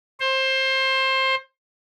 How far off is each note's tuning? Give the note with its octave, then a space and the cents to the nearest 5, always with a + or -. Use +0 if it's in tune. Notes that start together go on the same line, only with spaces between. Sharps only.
C5 +20